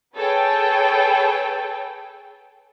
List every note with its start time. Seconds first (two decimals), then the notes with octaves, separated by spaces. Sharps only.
0.14 G#4 A4 B4 C#5 G5